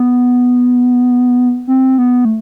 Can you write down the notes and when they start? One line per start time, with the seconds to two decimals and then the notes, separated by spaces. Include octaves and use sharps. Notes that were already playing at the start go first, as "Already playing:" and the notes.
Already playing: B3
1.67 C4
1.98 B3
2.25 A3